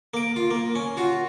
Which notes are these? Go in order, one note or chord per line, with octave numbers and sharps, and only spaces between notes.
A#3 D6
F4
A#3
C#4
F4 F#4